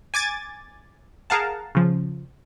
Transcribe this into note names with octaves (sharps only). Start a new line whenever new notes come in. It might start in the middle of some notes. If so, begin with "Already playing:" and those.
G#5 D6 G#6 A6
G#4 A#4 F5 F#5 A5
C#3 F3